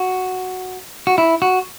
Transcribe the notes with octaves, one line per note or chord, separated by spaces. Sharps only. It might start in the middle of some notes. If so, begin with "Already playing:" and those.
Already playing: F#4
F#4
E4
F#4